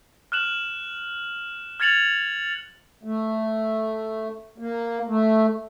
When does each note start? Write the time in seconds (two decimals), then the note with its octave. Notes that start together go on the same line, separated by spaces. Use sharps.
0.32 F6 F#6 E7 F#7
1.80 F6 G#6 A6 C#7 F7 F#7
3.03 A3
4.58 A#3
5.07 A3